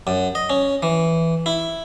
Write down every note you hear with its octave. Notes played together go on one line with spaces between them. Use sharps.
F#2
D#5
C#4
E3
E4